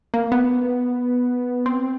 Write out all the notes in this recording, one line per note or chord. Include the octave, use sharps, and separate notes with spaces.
A#3
B3
C4